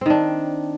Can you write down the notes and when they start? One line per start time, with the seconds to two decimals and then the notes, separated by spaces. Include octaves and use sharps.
0.01 C4
0.06 D#3
0.10 D4